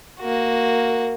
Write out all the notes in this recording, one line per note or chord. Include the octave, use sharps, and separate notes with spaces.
A#3 F#4